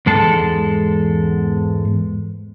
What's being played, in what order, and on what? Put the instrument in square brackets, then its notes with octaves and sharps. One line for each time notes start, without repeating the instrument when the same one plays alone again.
[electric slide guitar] E2 G#2 G#3 A4 A5